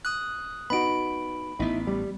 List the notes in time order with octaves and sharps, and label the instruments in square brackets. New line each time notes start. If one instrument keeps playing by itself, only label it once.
[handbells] D#6 F#6
[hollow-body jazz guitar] B3 D#4 F#4 [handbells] B5 D7
[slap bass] A1 B3 [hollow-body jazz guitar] D#4 E4
[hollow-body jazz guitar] G3